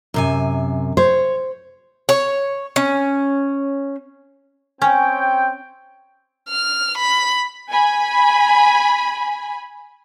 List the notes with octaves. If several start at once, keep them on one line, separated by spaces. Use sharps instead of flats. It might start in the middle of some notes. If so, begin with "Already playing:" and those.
F#2 C3 G#5
C5 C#5
C#5
C#4
C4 C#4 C#5 G5
F6
B5
G#5 B5